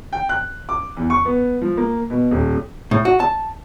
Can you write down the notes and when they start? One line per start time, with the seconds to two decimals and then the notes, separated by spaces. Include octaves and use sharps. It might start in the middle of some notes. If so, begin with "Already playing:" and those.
0.13 G5
0.29 F#6
0.69 D6
0.97 E2
1.10 C#6
1.25 B3
1.62 F3
1.77 A#3
2.10 B2
2.31 D#1
2.91 A2
3.05 F#4
3.20 A5